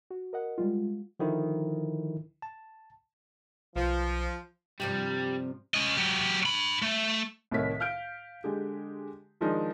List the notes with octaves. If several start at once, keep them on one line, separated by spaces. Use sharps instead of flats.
F#4
A#4 D#5 F#5
G3 G#3 F4
D3 D#3 F3 E4
A5
B1 F3
G2 C3 F3 G3
C#4 D#5
F#3 G4
D4 B5
A3
C2 A2 D#3 C#5 B6
F5 F6 G6 D7
D3 G#3 G4
D#3 F3 G#3 D4 D#4